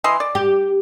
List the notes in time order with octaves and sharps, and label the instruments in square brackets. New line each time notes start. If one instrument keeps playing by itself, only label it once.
[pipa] E3 D#5 C6
D5
[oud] G4